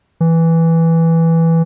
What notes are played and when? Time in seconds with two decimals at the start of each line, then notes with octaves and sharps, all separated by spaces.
0.21 E3